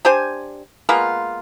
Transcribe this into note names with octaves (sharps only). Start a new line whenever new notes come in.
D4 G4 C5 G#5
G#3 A#3 B3 F4